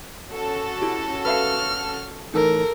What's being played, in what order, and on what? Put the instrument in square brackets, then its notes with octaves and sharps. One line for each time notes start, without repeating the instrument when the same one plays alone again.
[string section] C#4 F#4 A4
[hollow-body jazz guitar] E4 G4
[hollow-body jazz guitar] B4 E5 F5 [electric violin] F6
[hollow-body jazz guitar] A2 E3 D#4 [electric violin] A4 A#4